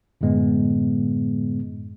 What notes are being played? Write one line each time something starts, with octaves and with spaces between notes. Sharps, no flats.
F#2 A2 D3 G#3 B3